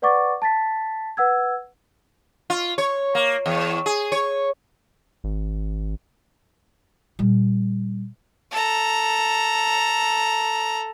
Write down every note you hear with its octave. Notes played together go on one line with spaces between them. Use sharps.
B4 D5 F#5 C#6 D6 A6
A5 A6 B6
B4 F#5 E6 G#6
F4
C#5
A#3
E2
G#4
C#5
G#1
A#2 G3
A4 A#5